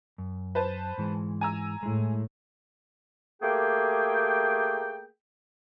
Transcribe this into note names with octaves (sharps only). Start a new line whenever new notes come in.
F#2
B4 C5 A5
G#2 E3 G#3
G#5 A#5 E6
A2 G#3 E4
A3 A#3 G4 G#4 G5